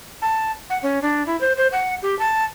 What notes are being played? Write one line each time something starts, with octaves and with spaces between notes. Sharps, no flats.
A5
F#5
C#4
D4
E4
C5
C5
F#5
G4
A5